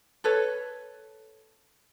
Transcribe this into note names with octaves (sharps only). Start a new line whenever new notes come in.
A4 B4 C#5